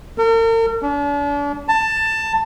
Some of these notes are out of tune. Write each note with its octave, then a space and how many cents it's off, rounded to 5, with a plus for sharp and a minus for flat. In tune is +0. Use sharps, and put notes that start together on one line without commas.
A#4 -45
D4 -40
A5 +15